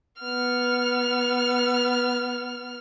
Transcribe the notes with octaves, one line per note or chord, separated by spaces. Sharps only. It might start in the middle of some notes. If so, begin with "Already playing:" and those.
B3 F6